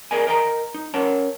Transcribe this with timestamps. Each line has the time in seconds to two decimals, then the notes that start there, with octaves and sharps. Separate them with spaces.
0.11 G#4 A#4 D5 D#5 G#5
0.27 A#4 D#5 G5 A5 A#5
0.74 D#4
0.94 C#4 A#4 C#5 F#5 A5